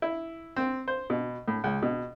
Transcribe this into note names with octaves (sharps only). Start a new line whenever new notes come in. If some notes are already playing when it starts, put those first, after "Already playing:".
E4
C4
C5
B2
A2
C#2
B2